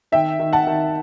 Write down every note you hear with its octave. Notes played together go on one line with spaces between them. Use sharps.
D#3 E5 G5
D#3
F#5 A5
D#3